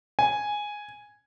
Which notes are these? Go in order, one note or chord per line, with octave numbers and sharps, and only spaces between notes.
G#5